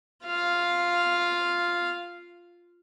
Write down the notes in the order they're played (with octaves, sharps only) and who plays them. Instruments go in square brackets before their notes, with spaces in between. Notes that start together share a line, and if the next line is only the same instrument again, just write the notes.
[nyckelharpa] F4 F5